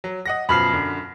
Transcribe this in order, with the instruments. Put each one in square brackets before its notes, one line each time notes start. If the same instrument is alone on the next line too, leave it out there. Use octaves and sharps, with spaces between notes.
[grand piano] F#3
D#5 F#5 A#6
[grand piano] F#2 B2 F3 [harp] B5 F6 C7
[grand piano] F#2 D3